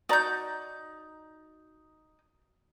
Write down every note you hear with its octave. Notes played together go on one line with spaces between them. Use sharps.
D#4 F#4 D5 A#5 G6